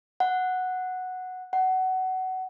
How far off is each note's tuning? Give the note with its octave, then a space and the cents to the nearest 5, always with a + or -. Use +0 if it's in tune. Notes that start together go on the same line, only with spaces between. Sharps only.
F#5 -5
F#5 +20